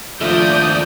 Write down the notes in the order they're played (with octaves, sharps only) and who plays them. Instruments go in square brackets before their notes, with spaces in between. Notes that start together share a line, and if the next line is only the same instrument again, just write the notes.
[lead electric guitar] D#2 D4 [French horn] F3 [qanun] A3 [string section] D5 D#6 G6